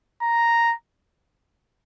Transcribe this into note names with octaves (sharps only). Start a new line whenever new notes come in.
A#5